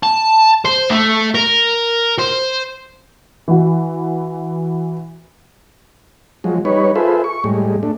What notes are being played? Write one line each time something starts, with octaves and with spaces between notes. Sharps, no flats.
A5
C5
A3
A#4
C5
E3 F#4
F3 F#3 G#3
G3 D#4 B4 C#5
F4 G#4 A4 B4 C5 E5
C#6
A2 G3 G#3
A3 D4